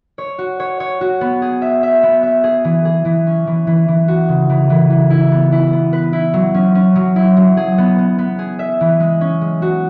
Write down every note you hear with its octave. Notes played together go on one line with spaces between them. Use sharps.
C#5
F#4
C#5
C#5
F#4
B3
G#4
E5
E5
B3
E5
G#4
E3
G#4
E3
C#4
E3
E3
E3
F#4
C#3
E3
E3
E3
E4
B3
E4
B3
B4
E4
F#3
C#4
C#4
F#3
E4
F#3
G#4
B3
B3
B3
G#4
E5
E3
G#3
C#4
G#3
F#4